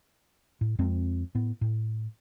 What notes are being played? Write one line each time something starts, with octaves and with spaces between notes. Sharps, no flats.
A2
F2 G#3 C4
A2 B3
A2